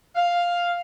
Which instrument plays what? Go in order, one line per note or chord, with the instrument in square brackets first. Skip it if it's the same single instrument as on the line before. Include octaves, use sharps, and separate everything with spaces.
[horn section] F5